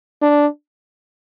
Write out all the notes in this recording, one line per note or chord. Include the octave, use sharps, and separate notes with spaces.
D4